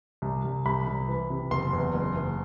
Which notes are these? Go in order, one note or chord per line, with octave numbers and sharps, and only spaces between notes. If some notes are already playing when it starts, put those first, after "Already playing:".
C2
C2
C2 B5
C2
E3
C3
F#1 C6
E2
F#1
F#1